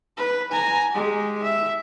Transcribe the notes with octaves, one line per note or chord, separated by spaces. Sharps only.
B4
G#5 A#5
G#3 G4
E5